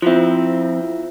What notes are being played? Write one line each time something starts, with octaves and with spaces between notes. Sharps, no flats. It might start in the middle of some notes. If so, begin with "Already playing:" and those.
F3 C4 E4 F4 E5